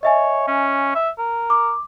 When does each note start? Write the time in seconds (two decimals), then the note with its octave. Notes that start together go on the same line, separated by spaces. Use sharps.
0.03 C#5 D#5 E5 G#5
0.48 C#4
0.95 E5
1.18 A#4
1.50 D6